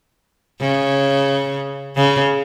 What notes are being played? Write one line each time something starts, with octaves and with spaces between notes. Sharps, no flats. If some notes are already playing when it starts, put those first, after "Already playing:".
C#3
C#3